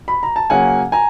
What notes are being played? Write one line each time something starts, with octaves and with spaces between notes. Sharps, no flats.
B5
A#5
A5
C#3 F#3 A#3 C#4 F#5 G#5
G#5 A#5